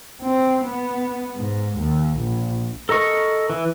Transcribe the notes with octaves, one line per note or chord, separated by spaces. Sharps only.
C4
B3
G#2
D#2
A#1
A4 A#4 D#5 C#6
E3